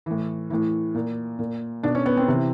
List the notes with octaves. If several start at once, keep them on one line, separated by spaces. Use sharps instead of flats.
A2 E3
A2 E3
A#2
A#2
B2 D4
C#4
B3
C4
C3 E3